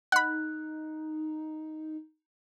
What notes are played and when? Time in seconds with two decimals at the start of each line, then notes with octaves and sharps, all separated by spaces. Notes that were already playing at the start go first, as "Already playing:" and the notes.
0.12 D#4 F#5 B5 F#6